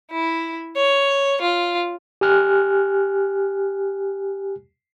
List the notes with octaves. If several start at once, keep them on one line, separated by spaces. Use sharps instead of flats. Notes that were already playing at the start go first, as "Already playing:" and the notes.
E4
C#5
F4
G4 G#5 F6 F#6